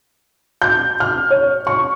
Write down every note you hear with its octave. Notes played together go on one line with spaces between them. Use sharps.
G6
F6
C#5
C#6